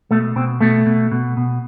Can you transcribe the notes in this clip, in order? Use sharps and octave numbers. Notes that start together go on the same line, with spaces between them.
B2 A3
B2 C4
B2 A3
B2
B2
B2